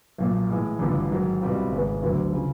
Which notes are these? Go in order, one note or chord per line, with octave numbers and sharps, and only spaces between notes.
B1 A#2 F3
A2 E3 G#3
A1 G2 D3 F3
G#2 D#3 F#3
C2 B2 G3 C4 F4
G#1 G#2 D#3 G#3 B3
D2 D3 F#3 B3
C#3 F3